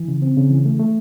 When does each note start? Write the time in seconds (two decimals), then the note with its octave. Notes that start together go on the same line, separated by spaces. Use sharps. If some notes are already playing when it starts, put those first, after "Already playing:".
Already playing: E3
0.08 C#3
0.22 C4
0.37 C#3
0.50 E3
0.65 A3
0.80 A3